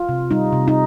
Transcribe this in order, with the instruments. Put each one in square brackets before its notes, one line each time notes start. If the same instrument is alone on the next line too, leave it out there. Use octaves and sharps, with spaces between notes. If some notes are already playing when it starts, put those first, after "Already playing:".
Already playing: [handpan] F4
C3
G3 D#4
C3
D#4